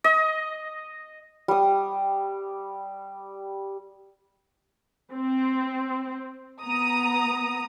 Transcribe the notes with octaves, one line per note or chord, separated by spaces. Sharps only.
D#5
G3 D#6
C4
B3 A#5 D#6